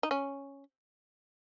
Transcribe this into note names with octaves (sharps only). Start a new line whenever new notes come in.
D#4
C#4